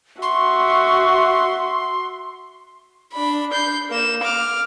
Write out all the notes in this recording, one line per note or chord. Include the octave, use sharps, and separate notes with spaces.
F#4 E5 C6 C#6
D4 B5
G6 C7
A#3 E7
D6 F6